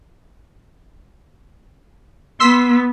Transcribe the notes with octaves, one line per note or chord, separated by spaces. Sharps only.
B3 C6 E6 B6